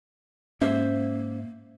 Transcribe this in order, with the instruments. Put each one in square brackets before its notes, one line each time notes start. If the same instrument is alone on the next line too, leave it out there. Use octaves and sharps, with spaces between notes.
[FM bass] G#2 [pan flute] A#3 [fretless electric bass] C#4 [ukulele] C5 E5